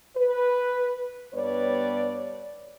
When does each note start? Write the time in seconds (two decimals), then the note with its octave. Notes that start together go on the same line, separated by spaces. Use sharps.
0.16 B4
1.34 G2 B3 B4 C#5 D5